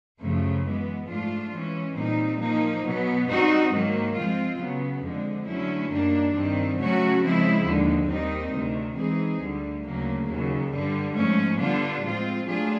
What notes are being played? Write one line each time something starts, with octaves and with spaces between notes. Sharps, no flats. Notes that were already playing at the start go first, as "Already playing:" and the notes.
F#2 C#3 F3 A3
E3 G#3 B3
G#2 F3 A3 D4 F4
E3 G#3 C#4
A#2 G3 C4 D#4
F3 A#3 D#4
B2 F#3 B3
G3 C4 D#4 F#4
G#2 D#3 F#3 A#3
F3 G#3 C4 F4
C#3 F#3 B3
F2 D3 F3 G#3 C4
D3 F#3 A3 C#4 E4
F#2 D#3 G3 A#3 D4
G2 D#3 G3 C4
C#3 F#3 A3 C#4 F#4
C#3 F3 G#3 C4 E4
D#2 D3 F3 G#3
D#2 D#3 G3 C4 D#4
D2 C3 D#3
E3 G#3 C4 D#4 G#4
D2 D3 G3
D2 C#3 F#3 A#3
D#2 C#3 F#3
G2 D3 G3
G#2 F3 A3 C#4
D3 G3 B3 D4 F4
A2 F3 G#3 C4 F4
F#3 A3 D4 F4 G#4